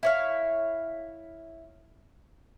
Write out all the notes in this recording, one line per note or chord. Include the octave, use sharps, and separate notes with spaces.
E4 C#5 F5